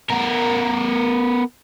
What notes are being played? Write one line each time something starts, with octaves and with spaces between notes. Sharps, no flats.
B3 A#4